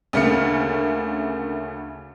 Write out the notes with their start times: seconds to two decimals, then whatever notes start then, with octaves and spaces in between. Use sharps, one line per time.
0.13 D2 C#3 A3 A#3 F6 C#7